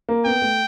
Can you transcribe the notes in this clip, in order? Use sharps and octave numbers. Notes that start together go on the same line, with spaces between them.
A#3
B3 G5
A3